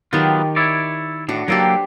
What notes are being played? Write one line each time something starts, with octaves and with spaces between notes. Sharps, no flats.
D#3 F#3 B3 F4 G4
E4 C#5 D5
A2 D4 F#4
F#3 A#3 G4 A4 B4 C5